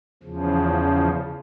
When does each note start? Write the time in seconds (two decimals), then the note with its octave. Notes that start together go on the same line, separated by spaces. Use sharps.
0.23 E2 C#3 F3